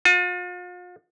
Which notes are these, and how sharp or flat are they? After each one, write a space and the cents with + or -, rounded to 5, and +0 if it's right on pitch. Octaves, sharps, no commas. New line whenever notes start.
F4 +40